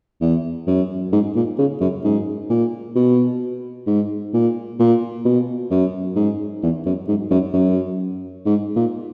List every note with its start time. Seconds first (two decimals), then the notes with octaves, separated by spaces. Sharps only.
0.21 E2
0.67 F#2
1.12 G#2
1.35 A#2
1.58 C#3
1.81 F#2
2.04 G#2
2.50 A#2
2.95 B2
3.87 G#2
4.34 A#2
4.79 A#2
5.25 B2
5.71 F#2
6.16 G#2
6.63 E2
6.86 F#2
7.07 G#2
7.31 F#2
7.53 F#2
8.45 G#2
8.76 A#2